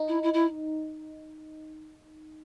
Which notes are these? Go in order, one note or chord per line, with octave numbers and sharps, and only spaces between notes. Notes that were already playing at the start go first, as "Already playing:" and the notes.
Already playing: D#4
E4
E4
E4